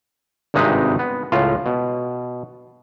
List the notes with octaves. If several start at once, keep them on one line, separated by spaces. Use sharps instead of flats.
G#1 G2 C3 G#3 D#4 B4
B3
C#2 A2 F4
B2